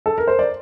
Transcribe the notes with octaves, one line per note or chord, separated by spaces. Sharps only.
A4
A#4
C5
D5